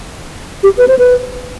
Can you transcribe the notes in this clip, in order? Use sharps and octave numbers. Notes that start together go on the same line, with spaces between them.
G4
B4
C5
B4